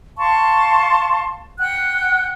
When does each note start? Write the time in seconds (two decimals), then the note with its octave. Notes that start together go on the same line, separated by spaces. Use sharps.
0.18 F5 A5 C6 C#6
1.58 F#5 G5 F#6